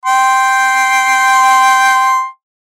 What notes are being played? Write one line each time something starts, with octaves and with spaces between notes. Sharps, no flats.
G5 C6